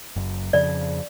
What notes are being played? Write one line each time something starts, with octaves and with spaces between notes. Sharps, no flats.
F#1 F#2
F2 C#3 F3 D5